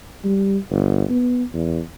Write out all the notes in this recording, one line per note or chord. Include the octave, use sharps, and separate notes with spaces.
G3
G1
B3
E2